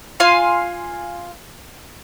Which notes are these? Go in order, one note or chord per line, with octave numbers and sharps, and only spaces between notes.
F4 F5 G#5 C6